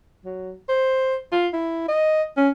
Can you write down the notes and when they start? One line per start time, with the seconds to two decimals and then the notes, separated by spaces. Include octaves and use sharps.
0.25 F#3
0.69 C5
1.32 F4
1.53 E4
1.88 D#5
2.37 C#4